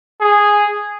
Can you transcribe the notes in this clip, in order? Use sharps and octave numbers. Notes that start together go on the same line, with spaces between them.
G#4